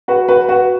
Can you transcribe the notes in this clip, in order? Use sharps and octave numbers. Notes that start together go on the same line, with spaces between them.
F#4 B4
F#4 B4
F#4 B4